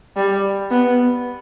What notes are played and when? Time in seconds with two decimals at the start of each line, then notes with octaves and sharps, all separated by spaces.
0.16 G3
0.71 B3